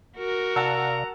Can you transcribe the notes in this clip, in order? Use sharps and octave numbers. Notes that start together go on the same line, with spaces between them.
F#4 A#4
C3 D5 F5 F#5 A5 A#5 E6